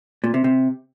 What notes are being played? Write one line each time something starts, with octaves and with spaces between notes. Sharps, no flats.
A#2
C3
C3